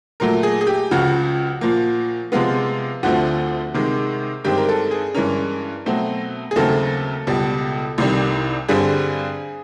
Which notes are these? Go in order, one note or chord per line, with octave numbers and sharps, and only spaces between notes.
A#2 F#3 A3 A#4
G#4
G#4
G4
C#2 C#3 F3 F#4
A#2 F3 A#3
C3 F3 G#3 B3 F4
D2 D3 F3 A3 C4 F#4
C3 D#3 G#3
G2 D#3 G#3 C4 G4
A#4
A4
G#4
G2 E3 G#3 C#4 A#4
B2 F#3 A3 C4
G#4
D#2 C#3 F#3 A3 C4 A4
C#2 B2 G3
C2 C3 D#3 G3
G2 D3 G3 C4 G#4